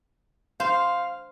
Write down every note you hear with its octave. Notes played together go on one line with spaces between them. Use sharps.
C5 F5